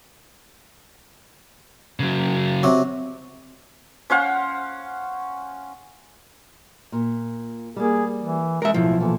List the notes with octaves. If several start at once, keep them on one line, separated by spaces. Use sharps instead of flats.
C#3 F#3
C3 F#3
C#4 C5 F5 F#5
A#2
G3 A#3 G#4
E3
G#3 A#4 E5
B1 A2 F3 E4
A#2 E3 A4